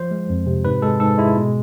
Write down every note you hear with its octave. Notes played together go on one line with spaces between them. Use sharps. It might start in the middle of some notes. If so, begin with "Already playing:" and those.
Already playing: F3 C5
G#3
F2
C3
G#2 B4
G#3 A4
G#2 A4
G#3 E4
B2